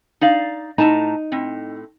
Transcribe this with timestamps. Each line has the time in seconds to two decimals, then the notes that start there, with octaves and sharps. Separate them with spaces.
0.21 D#4 D5 F5
0.78 A2 D#4 A5 A#5
1.32 A2 C4